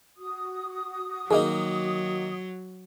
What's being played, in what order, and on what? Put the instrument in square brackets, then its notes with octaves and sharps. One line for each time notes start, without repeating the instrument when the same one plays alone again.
[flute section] F#4 D#6
[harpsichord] D#3 A#3 D#4 [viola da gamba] F#3 [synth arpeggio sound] G#4 D#5